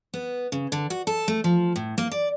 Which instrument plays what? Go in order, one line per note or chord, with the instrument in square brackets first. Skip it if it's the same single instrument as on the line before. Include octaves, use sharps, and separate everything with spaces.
[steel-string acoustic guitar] B3
C#3
D3
F#4
A4
A3
F3
A2
A#3
D5